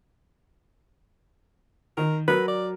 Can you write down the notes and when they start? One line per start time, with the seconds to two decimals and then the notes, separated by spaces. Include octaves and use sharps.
1.97 D#3 A#4
2.28 F#3 A#4 B4
2.48 D5